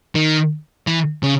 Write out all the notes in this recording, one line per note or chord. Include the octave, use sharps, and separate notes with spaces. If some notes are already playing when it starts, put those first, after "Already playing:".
D#3
E3
C#3